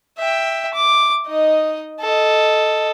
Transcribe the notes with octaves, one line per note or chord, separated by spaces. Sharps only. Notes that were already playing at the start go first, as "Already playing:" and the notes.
E5 G5
D6
D#4 D#5
A4 D#5